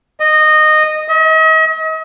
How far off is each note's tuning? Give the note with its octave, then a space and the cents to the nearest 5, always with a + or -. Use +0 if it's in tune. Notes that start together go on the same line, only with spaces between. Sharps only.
D#5 -15
D#5 +40